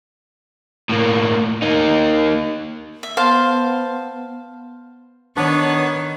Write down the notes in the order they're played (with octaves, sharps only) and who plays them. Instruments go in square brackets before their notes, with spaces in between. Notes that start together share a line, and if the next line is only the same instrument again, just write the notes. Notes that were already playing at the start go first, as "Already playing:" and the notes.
[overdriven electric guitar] A2 A#3
A#3 D#4
[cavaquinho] E5
[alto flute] B3 [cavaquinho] C5 F5 A5
[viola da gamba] D#3 [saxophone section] B3 [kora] D4 [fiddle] C#5